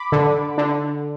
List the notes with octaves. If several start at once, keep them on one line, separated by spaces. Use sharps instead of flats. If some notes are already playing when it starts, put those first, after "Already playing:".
Already playing: B5 D6
D3
D3